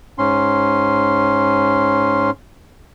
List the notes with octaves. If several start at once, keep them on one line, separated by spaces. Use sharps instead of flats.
G#2 C#4 C6